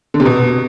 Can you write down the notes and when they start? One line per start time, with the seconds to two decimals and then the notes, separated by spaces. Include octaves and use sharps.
0.14 D3
0.20 C3
0.26 B2